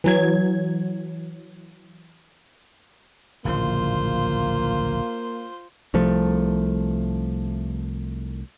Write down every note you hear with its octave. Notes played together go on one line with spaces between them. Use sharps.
E3 F#3 G#6
D1 A#1 C#3 A#3 F4 C5
C2 C3 F3 A3